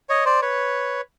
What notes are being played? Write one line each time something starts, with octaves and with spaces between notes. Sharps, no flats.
C#5 D#5
C5 D5
B4 C#5